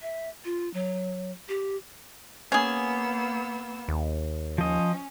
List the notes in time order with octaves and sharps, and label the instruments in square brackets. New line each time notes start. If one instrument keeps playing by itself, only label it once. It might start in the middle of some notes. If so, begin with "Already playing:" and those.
[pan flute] E5
F4
F#3
G4
[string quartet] A#3 B3 E6 [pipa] C#4 G#4
[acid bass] D#2
[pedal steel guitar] F3 D#5 [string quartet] C#4